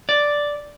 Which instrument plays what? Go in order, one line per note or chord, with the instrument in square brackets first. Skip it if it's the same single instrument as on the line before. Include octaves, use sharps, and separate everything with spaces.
[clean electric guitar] D5